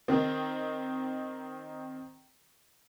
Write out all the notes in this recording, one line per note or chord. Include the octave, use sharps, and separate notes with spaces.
D#3 C4